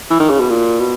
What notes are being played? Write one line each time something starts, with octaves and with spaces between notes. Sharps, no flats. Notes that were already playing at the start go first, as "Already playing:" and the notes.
E3
D#3
C#3
B2
A#2
B2